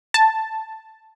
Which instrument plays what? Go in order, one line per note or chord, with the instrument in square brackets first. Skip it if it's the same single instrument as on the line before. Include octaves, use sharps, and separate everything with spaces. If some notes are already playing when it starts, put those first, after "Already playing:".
[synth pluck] A5